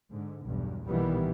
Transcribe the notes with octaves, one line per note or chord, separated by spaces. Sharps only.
G#2 D3
B1 E2 G2
B1 A#2 D#3 E3 G3 B3